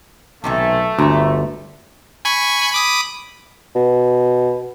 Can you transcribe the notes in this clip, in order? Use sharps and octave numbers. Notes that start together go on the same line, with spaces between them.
B1 C3 D#3 E3 A3
G1 D2 E5 A#5
G#5 B5 C#6
B5 D6 D#6
B2